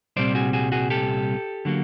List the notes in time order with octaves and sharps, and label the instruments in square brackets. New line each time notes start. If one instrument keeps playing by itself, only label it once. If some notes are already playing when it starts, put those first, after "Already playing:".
[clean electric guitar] C2 A#2 G3 C4 C5 D5
F#4 G#4
F#4 G#4
F#4 G#4
G4 A4
D3 F#3 A#3